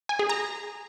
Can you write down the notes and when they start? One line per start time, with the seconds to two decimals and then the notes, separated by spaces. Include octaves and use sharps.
0.09 G#5
0.19 G#4
0.29 A#5